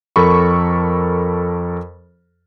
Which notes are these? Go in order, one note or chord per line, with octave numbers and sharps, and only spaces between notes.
F2 A4 A#4 B5 C#6